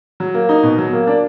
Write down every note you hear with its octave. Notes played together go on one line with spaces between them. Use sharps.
F#3
A#3
D#4
B2
F#3
A#3
D4